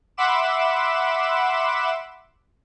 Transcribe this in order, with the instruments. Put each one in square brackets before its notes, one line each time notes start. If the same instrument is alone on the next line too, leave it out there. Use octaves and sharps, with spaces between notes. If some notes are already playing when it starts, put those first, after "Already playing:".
[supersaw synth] E5 F#5 B5 C6 D6 E7